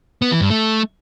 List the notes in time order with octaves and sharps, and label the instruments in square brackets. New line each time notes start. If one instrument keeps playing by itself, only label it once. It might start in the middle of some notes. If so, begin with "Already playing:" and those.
[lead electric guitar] B3
E3
G2
A3